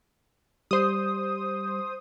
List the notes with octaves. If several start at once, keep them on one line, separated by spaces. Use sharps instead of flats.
G3 C5 D#6